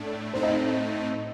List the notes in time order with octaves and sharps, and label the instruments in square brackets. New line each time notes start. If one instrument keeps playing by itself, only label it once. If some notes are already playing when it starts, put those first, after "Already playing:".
Already playing: [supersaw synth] A2 A3 D4
[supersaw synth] A2 A3 C4 D#4 [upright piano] C5
[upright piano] D#5